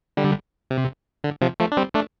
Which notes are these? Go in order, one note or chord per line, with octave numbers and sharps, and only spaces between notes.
D3 G3
C3
D3
C3 F3
F3 A3
D4
G3 C4
A3 D4